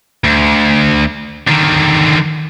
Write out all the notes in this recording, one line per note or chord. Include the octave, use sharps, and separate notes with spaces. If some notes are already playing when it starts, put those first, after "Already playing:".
D2
D3 D#3